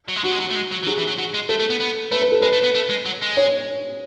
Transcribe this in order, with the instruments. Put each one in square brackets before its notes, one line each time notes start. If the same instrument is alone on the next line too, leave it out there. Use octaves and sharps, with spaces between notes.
[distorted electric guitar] F#3
G#3
[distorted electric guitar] F#3 [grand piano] F#4
[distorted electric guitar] G#3
F#3
A3
G#3
F#3
E3
[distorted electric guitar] F#3 [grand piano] G#4
[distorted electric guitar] E3
F#3
F#3
G#3
[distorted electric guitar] A3 [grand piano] A4
[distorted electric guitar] A3
B3
B3
[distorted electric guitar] A3 [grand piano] B4
[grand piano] B4
A4
[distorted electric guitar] G#3 [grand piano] B4
[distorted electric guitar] A3
B3
A3
G#3
F#3
G#3
[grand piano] C#5